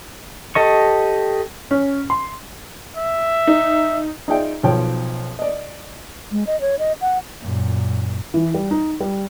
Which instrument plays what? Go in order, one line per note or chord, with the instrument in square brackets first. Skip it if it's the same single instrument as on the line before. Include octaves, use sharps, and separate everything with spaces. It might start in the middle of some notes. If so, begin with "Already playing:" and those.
[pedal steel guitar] G4 A4 D#5 C#6
[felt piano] C#4
C6
[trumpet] E5
[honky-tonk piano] D#4
[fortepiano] D#4 F4 G#4 D5 E5 G5
B1 F3 C#5 G5
D5 D#5
[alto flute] G#3
D#5
C#5
D#5
F#5
[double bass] F#2 A#2
[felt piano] E3
G3
D#4
G3